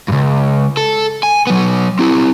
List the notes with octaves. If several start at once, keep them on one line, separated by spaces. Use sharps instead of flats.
C#2 G2
A4
G#5
F#3 B3
C4 E4